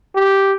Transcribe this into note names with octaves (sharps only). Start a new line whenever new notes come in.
G4